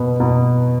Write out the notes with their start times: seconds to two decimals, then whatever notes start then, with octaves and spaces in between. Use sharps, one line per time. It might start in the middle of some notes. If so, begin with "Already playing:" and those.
Already playing: B2 B3
0.20 B2 B3